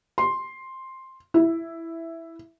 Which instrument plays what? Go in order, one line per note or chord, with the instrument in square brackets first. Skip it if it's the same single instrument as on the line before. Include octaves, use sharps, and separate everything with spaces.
[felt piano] C6
E4